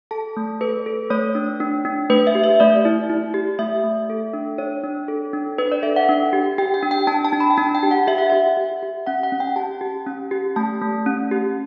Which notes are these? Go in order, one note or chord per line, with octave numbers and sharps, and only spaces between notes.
A4 A5
A3
A4 B4
A4
A3 C#5
D4
D4
D4
A3 B4
E5
G4
E5
A3 D5
E4
E4
G4
A3 E5
A3
A4
D4
D4 C#5
D4
A4
D4
D4 B4
D5
A4 E5
F#5
D4
G4
G4 G5
G5
D4
G5
D4 A5
A5
D4
B5
G5
D4 A5
G5
G4
F#5
G4 E5
F#5
G4 E5
G4
G4
C#4 F#5
F#5
C#4
G5
G4 A5
G4
C#4
G4
A3 A5
A3
C#4
G4